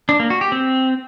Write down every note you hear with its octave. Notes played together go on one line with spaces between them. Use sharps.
D4
A#3
F#4
G4
C4